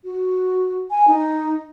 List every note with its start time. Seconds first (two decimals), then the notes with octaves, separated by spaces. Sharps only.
0.04 F#4
0.91 G#5
1.08 D#4